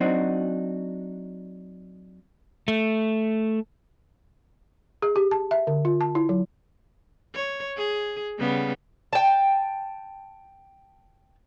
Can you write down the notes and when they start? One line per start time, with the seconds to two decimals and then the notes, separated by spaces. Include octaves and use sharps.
0.01 F#3 C4 D4 D#4 F#4
2.68 A3
5.02 G#4
5.16 G4
5.31 A5
5.51 E5
5.67 D3
5.85 F4
6.01 A5
6.15 E4
6.29 F#3
7.34 C#5
7.77 G#4
8.38 C#3 G3 B3
9.13 G5 A5